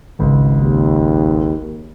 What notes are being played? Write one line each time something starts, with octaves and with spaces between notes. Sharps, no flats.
G#1 C#2
D#2